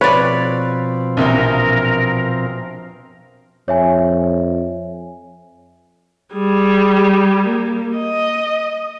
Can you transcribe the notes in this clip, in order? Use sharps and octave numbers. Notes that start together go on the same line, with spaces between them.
B2 F3 C4 B4 C#5 D5
A#1 C3 E3 A#4
F2 C#5 E5 G#5
G3 G#4
A#3
D#5